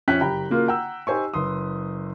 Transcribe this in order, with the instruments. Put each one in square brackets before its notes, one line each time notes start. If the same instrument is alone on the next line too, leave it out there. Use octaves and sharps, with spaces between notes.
[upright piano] F2 C#4 E5 G5 F#6 B6
F#1 G4 G5 A#5 B5
C#3 A#3 F4 F#4 A#4
F#5 G5 A#5 E6
D#4 G4 C5 G#5 C#6
F#1 B4 C6 D#6